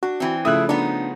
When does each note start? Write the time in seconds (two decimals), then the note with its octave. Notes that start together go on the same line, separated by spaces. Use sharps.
0.03 D4 F#4
0.20 E3 C4
0.45 C#3 F3 A3 E4 D#6 E6 F#6
0.69 B3 D4 D#4